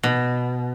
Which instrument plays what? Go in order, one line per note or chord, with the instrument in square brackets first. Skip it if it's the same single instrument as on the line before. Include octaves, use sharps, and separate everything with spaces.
[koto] B2